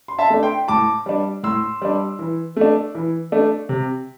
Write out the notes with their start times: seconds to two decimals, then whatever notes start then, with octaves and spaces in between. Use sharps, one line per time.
0.08 C6
0.19 E5 A5
0.30 A3 D4
0.43 G5 C6
0.68 A2 A5 D6
1.06 G3 D4
1.43 A2 C6 E6
1.82 G3 D4
2.19 E3
2.56 A3 D4
2.95 E3
3.32 A3 D4
3.69 C3